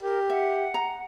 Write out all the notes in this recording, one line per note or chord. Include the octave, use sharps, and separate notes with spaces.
G4 A#4
E5 F#5
A#5